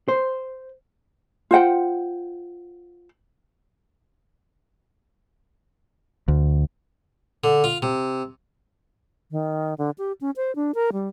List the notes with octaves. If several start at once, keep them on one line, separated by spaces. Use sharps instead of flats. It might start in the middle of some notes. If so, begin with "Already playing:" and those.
C5
F4 C5 F#5 G5
D2
D3
F4
C3
D#3
D3
G4
C#4
C5
D4
A#4
G3